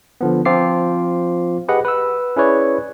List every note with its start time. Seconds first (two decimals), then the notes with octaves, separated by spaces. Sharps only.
0.21 D3 F3 B3
0.45 F3 C4 F4 D6 C7
1.68 G4 G#4 B4 D#5 F#5
1.85 B4 E6
2.36 C#4 E4 G#4 B4 C#5 D5